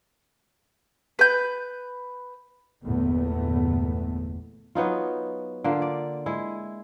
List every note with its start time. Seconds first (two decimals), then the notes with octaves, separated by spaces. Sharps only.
1.19 B4 G6
2.82 G1 E2 A#2 A3 B3
4.75 F#3 B3 D#4 F4
5.64 D3 A#3 F4
5.82 D5
6.26 G#3 E4